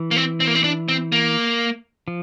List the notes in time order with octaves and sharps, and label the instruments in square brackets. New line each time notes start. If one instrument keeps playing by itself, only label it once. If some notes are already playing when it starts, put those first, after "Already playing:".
Already playing: [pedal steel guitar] E3
[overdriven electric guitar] A#3
C4
C4
A#3
C4
D4
C4
A#3
[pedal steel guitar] F3